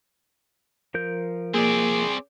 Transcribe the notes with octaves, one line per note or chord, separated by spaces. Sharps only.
F3 A#4 G6
A#3 C4 G#4 D5